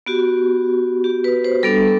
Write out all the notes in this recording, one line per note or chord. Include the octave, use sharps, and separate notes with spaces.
B3 F#4 G4
G4
B4
C5
G3 B3 D4 A4